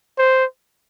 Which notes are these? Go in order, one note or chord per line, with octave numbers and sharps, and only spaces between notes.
C5